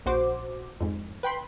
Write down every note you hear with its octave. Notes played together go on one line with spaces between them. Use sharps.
A#1 F#4 C5 D6
F2 G#2
B4 G5 B5 C6